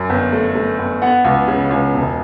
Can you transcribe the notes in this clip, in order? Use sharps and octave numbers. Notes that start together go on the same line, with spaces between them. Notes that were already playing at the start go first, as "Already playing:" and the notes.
Already playing: F#2
G1
A3
A3
G1
B3 F#5
C#2
C#3
C#2
E1